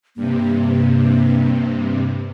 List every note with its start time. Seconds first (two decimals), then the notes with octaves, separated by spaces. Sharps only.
0.16 G2 C3 A#3